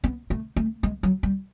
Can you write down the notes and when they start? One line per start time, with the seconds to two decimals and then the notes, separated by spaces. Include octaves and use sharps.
0.04 B3
0.30 A3
0.56 A3
0.83 G#3
1.03 F#3
1.23 G3